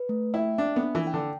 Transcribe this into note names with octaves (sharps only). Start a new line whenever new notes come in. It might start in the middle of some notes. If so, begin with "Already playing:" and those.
Already playing: B4
A3
E4 G5
D4 E5
B3
D4
E3
G5
D3